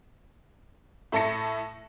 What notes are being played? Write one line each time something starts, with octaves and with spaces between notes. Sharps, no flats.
A2 E4 A4 A5 A#6 C#7